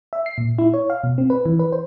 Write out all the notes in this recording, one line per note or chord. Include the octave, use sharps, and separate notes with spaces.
E5
C7
A#2
E4
C#5
F5
B2
C4
B4
E3
B4
C5